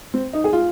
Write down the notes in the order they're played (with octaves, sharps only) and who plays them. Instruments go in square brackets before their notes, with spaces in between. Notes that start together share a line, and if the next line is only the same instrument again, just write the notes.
[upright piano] C4
D#4
G#4
F4